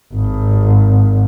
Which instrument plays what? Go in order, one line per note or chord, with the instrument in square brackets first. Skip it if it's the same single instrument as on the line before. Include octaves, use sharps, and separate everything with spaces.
[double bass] G#1